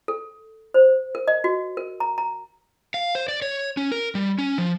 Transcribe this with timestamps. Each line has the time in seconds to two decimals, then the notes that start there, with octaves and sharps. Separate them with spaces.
0.08 A4
0.74 C5
1.15 A#4
1.28 D#5
1.44 F#4
1.77 A#4
2.00 A#5
2.18 A#5
2.94 F5
3.15 C5
3.28 D5
3.42 C#5
3.77 C#4
3.92 A#4
4.15 G3
4.38 C#4
4.58 F3